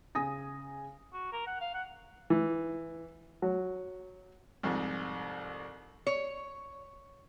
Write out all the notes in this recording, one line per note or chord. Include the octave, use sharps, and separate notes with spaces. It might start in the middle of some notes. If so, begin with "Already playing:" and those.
C#3 G#5 D#6 A#6
F#4
A#4
F#5
F5
F#5
E3
F#3
C2 F2 G#2
C#5